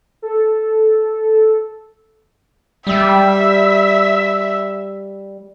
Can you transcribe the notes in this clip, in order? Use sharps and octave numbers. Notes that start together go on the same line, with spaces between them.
A4
G3 E5